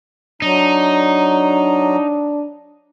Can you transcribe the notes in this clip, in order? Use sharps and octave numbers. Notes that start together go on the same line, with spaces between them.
F#3 D4 D#4 A#5